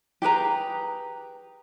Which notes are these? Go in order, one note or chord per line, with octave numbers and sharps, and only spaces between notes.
G4 G#4 B4 A#5